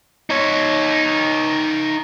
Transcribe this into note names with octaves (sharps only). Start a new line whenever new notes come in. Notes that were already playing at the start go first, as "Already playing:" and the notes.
D#4 C#5